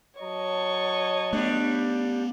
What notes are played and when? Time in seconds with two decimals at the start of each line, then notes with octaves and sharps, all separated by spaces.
0.20 F#3 C#5 D#5 A5 C#6
1.33 G3 A3 B3 D4